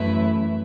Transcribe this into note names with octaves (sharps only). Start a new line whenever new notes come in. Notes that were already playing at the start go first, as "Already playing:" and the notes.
Already playing: F#2 E3 A3 E4 B4